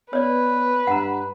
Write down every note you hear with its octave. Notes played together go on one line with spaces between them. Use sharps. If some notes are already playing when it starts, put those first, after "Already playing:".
B3 B4 C#5 D5
G2 F#5 A#5